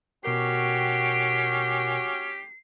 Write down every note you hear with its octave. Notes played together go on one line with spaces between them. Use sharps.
B2 C#4 F#4 G4 A#4 G5 C7